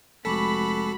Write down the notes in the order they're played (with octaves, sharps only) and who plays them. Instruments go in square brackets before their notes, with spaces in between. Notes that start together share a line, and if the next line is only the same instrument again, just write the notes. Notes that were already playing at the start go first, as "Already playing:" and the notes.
[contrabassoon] F1 [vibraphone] G#3 C#6 D6 [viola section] F#4 B5 [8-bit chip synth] A4